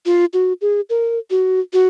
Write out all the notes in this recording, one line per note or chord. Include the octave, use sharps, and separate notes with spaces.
F4
F#4
G#4
A#4
F#4
F#4